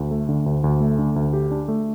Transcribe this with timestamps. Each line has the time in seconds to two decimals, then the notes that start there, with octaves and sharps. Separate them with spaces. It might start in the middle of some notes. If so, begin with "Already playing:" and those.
Already playing: D2
0.11 A3
0.29 D3
0.46 D2
0.64 D2
0.81 A3
0.98 D3
1.16 D2
1.33 G4
1.51 D4
1.68 A3